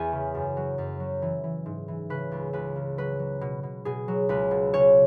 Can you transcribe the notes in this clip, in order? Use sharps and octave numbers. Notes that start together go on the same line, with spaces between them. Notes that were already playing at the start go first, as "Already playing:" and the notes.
Already playing: E2 G#5 B5
C#3
F#2
F#3
F#2
F#3
E3
E3
G#2
E3
C#3 B4
C#2
C#2 B4
C#3
F#3 B4
F#3
B2
B2
B2 G#4
F#3
C#2 B4
B2
C#3 C#5